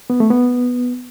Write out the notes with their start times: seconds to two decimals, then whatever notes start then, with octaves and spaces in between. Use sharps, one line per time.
0.10 B3
0.20 A3
0.30 B3